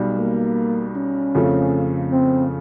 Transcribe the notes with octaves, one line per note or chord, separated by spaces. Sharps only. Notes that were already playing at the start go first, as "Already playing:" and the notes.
Already playing: B1 B2 G3
A#3
C#4
F2 C#3 F3 A3
C4